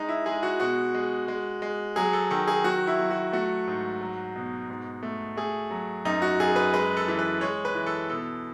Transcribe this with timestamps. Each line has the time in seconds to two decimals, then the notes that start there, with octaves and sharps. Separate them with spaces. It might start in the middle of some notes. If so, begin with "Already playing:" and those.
Already playing: G#3 D#4
0.09 E4
0.26 G#3 G#4
0.43 F#4
0.60 B2 F#4
0.95 G#3
1.28 G#3
1.62 G#3
1.96 F#3 G#4
2.13 A4
2.31 D#3 A4
2.48 G#4
2.64 F#3 F#4
2.87 E4
2.99 F#3
3.11 F#4
3.33 A3 F#4
3.68 G#2
4.01 F#3
4.36 B2
4.70 G#2
5.03 A3
5.37 A3 G#4
5.71 F#3
6.05 F#2 D#4
6.22 F#4
6.40 F#2 G#4
6.56 B4
6.74 G#3 B4
6.97 A4
7.08 E3
7.19 B4
7.41 G#3 C#5
7.65 B4
7.75 E3
7.86 A4
8.09 B2 A4